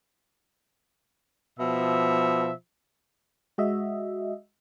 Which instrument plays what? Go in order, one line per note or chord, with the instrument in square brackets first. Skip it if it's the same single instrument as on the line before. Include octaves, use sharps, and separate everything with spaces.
[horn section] B2 F3 E5
[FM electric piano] G#3 F#4 D#5 E5